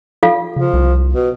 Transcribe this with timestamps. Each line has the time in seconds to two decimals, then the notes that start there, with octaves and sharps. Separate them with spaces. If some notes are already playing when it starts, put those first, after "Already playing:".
0.23 F4 A4 F5
0.56 C#3 F3
0.73 C2
1.13 B2